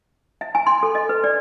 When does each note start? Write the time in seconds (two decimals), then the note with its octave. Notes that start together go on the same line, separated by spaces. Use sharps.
0.41 E5
0.55 G#5
0.67 C6
0.83 A4
0.95 D#5
1.09 B4
1.24 D5